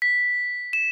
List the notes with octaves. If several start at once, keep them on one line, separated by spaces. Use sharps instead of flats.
B6
E7